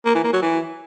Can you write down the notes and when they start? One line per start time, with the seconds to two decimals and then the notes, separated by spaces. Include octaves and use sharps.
0.06 A#3
0.15 E3
0.24 A#3
0.33 F#3
0.42 E3